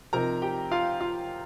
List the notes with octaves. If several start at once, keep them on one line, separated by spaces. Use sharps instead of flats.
C3 F3 D#4 A#4 A#5
G4 G5
F4 F5
F4 F5